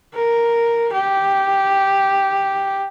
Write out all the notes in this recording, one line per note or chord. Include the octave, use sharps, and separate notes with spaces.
A#4
G4